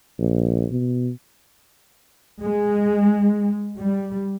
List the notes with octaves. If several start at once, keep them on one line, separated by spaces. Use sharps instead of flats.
A#1
B2
G#3
G3